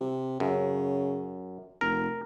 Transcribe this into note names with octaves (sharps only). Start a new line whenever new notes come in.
C3
F#2 C#3
F1 A#4